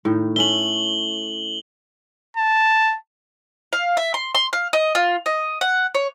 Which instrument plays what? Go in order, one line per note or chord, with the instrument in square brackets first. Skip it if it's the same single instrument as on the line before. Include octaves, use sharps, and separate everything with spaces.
[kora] A2 D#3
[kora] A3 C#4 E5 [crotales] F#7 G7
[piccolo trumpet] A5
[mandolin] F5
E5
C6
C6
F5
D#5
F4
D#5
F#5
C#5